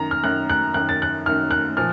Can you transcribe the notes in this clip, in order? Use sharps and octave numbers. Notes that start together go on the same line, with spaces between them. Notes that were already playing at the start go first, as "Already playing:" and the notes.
Already playing: F#2 D#3 A#5
F6
F#2 D#3 F#6
F#6
F#2 D#3 F#6
A6
F#6
F#2 D#3 F6
F#6
A#2 F3 F6